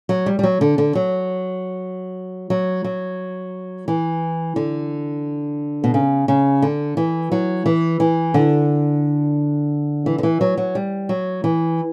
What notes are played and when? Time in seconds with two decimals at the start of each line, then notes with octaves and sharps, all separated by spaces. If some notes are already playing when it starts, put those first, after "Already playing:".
0.09 F#3
0.26 G3
0.39 G3
0.43 F#3
0.61 D3
0.78 D3
0.95 F#3
2.50 F#3
2.84 F#3
3.88 E3
4.56 D3
5.84 B2
5.94 C#3
6.28 C#3
6.62 D3
6.97 E3
7.32 F#3
7.66 E3
8.00 E3
8.34 D3
10.06 E3
10.18 D3
10.23 E3
10.41 F#3
10.57 F#3
10.75 G3
11.09 F#3
11.44 E3